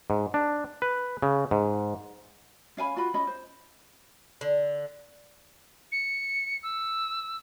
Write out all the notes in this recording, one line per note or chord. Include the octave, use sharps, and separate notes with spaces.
G#2
D4
B4
C#3
G#2
C#4 F5 G#5 B5
F4 F#4 B5
C#4 D#5 B5
C5
D3
C#7
E6